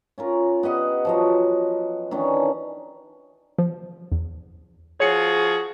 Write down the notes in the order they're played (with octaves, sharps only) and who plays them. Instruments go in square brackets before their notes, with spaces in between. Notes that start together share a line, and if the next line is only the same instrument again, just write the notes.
[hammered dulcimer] C#4 F4 A#4
B3 G4 D#5 F#5
F3 F#3 D#5
D#3 E3 C#4 D4
[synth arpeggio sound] F3
E2
[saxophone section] F3 F#4 G#4 [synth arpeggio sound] C#5 C#7